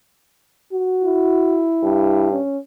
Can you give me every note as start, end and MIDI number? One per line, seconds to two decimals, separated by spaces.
0.73 1.67 66
1.04 2.29 64
1.84 2.37 43
2.32 2.58 61